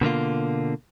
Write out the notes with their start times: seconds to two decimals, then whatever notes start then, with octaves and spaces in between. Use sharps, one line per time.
0.01 B2 D3 A#3 F4